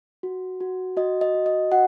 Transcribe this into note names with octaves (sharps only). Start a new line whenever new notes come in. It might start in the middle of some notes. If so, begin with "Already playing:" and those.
F#4
F#4
F#4 D#5
D#5
F#4
D#5
F#4 F#5